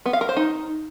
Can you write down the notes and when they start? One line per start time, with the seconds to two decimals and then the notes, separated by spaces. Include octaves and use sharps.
0.06 B3
0.13 F5
0.21 A#4
0.29 C5
0.36 D#4